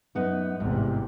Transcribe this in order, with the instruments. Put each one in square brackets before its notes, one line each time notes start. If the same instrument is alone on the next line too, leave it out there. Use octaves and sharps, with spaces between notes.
[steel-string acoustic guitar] F#2 B3 D#4
[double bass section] A1 E2 C3 [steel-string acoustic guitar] G#2